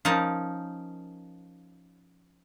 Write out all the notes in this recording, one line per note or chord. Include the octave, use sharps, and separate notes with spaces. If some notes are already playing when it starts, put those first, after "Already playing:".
F3 C#4 D#4 A#4 A5